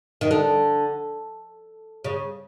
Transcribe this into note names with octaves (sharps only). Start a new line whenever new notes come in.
D#3
D3
C#3